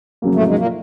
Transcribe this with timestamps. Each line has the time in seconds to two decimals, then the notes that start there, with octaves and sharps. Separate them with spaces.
0.22 F2 C#3 F#3 A#3
0.35 A2 A3
0.47 G#2 G#3
0.58 A#2 A#3